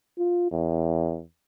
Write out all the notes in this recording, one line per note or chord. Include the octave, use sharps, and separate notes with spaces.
F4
E2